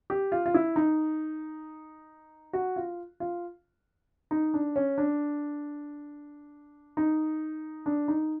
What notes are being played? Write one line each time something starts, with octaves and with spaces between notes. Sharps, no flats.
G4
F4
F4
E4
D#4
F#4
F4
F4
D#4
D4
C#4
D4
D#4
D4
D#4